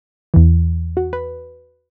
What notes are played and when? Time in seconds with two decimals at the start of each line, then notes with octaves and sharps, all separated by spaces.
0.34 E2 E3
0.97 F#4
1.13 B4